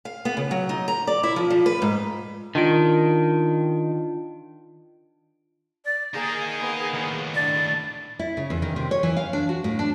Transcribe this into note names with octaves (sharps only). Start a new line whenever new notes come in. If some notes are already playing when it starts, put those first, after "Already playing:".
F5
B3
C#3
F#3
D#4
A#5
D5
E4
F3
F3
B4
G#2
D#3 D4 F4 D7
D5
A#3 D#4 G#4 A#4
A#3 B3
D#2 A2
D4 D5
E4
C#3
E2
D#3
C3
C#5
E3
F5
D4
F#4
A2
D4